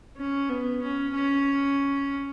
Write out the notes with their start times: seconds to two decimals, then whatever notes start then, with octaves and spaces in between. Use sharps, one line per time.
0.17 C#4
0.49 B3
0.82 C#4
1.14 C#4